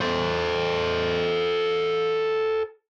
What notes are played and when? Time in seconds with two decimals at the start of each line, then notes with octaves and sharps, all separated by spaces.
0.01 A4 C5